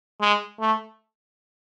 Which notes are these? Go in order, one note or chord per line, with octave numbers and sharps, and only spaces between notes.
G#3
A3